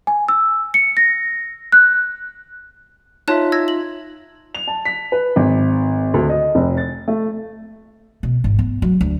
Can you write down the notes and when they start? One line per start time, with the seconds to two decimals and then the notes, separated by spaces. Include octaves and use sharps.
0.07 G#5
0.28 E6
0.74 C#7
0.97 A#6
1.72 F#6
3.28 D#4 F4 C#5 E5 A5 F#6
3.52 E6 G#6 A#6
3.68 F#7
4.55 F7
4.68 A5
4.85 B6
5.12 B4
5.36 G#1
6.14 D2
6.30 D#5
6.55 F1
6.77 A6
7.08 A3
8.23 B2
8.44 G#1
8.59 B3
8.82 F#3
9.01 D2